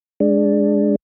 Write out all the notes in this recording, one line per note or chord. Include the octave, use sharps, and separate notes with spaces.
G#3 D4